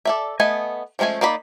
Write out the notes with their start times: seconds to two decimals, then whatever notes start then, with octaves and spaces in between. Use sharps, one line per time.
0.05 A4 D5 E5
0.40 A3 B3 D#5 G#5
0.99 F3 G#3 A3 C#4 G#5
1.21 A#3 D#4 D5 B5